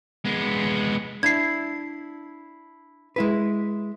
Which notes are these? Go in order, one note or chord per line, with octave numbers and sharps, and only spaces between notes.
G#3 B3
D4 E4 G#6 C7
G#3 E4 B4